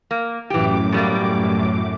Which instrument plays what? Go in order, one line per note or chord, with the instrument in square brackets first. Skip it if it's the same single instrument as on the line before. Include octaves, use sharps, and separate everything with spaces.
[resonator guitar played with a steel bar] A#3
[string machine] F#2 A2 D6 [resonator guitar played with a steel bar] E3 G4
[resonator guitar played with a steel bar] B2 G3 A#3